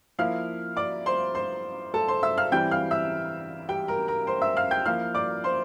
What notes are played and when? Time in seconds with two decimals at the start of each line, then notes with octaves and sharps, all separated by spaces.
0.19 F3 A#3 E4 F5 F6
0.77 D5 D6
1.06 C5 C6
1.35 C5 C6
1.94 A4 A5
2.08 C5 C6
2.23 E5 E6
2.37 F5 F6
2.52 E3 G3 C4 E4 G5 G6
2.71 F5 F6
2.91 E5 E6
3.69 G4 G5
3.88 A#4 A#5
4.08 A#4 A#5
4.27 C5 C6
4.42 E5 E6
4.57 F5 F6
4.71 G5 G6
4.86 F3 A#3 E4 F5 F6
5.15 D5 D6
5.44 C5 C6